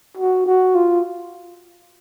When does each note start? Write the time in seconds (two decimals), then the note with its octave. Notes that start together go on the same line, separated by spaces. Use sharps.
0.17 F#4
0.46 F#4
0.75 F4